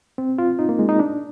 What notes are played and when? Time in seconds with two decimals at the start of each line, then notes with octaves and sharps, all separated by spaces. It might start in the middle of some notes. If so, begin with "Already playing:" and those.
0.18 C4
0.39 F4
0.59 D#4
0.69 A#3
0.79 G#3
0.89 D#4
0.99 D4